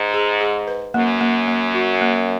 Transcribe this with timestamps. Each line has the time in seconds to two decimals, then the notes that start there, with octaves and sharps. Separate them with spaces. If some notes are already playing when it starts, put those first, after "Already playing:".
Already playing: G#2
0.14 G#4
0.41 G#4
0.67 B4
0.94 F#2 A#3
1.21 A#3
1.48 A#3
1.74 F#4
2.01 A#3